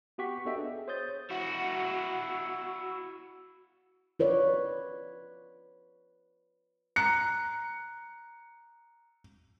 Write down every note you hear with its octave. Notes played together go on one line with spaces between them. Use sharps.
B3 F#4 G4 F#5 C#6 B6
B3 D4 A4 D#5 E5 G5
G#4
C5 C#5 D#6 G6 A6
E4 F#4
F4 B4 C#5 D5
A#5 F#6 C#7